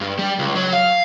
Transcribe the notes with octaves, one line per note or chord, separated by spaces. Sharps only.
G2
G3
C#2
F#3
F5